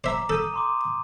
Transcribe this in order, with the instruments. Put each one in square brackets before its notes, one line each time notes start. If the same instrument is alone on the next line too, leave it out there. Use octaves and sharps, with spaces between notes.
[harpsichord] C5 E5 [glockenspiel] A#5 D6
[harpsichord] A4 [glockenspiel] D#6 G6 D#7
[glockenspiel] A#5 C6 D6